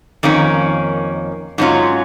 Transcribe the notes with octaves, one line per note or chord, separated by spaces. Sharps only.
F2 D#3 A#3 C#4
G#2 F#3 C#4 F4